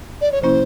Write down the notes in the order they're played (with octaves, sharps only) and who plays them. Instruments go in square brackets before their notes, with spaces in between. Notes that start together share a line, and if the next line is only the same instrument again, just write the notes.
[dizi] D5
C#5
[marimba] C3 F3 A#3 C#4 E4 [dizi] C5